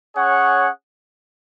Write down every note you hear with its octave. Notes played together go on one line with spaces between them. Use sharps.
C#4 G#4 C#5 F#5